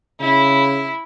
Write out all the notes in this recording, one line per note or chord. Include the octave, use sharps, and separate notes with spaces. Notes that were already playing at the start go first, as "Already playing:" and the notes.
C#3 E4